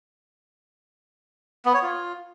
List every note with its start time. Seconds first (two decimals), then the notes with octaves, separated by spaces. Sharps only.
1.66 B3
1.74 C#5
1.82 F4